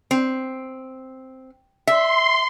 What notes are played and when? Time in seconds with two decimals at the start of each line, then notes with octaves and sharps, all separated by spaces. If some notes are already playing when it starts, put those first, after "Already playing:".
0.11 C4
1.87 E5 C6